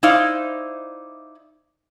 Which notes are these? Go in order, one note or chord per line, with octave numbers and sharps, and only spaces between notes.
D#4 E4 C5 D5 F5